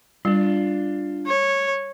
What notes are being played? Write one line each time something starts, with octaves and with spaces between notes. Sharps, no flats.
G3 D4 F4
C#5